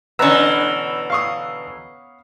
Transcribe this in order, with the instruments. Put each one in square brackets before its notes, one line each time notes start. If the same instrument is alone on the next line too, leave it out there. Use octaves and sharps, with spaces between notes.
[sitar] B2 D3 E3 [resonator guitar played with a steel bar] B3 C#4 [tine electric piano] B4 A#5 E6
[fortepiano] F5 C#6 D#6